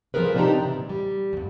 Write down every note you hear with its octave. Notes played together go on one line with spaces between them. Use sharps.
F3 G3 C#4 G#4 A#4 B4
C3 C4 D4 D#4 G4 A#5
C#3 E3
A#2
G3
E2 G2